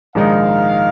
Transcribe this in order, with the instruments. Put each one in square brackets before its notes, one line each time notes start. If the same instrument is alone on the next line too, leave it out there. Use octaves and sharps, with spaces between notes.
[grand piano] A#1 G#2 D#3 G#3 D#4 [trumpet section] F5